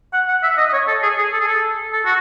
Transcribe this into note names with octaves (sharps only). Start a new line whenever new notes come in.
F#5
F#5
E5
D#5
D#5
C#5
A4
G#4
G#4
A4
G#4
A4
A4
F#4